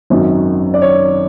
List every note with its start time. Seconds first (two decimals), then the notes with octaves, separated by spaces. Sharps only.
0.10 G#1 F#2 D#3 F#3
0.74 D5
0.81 C#5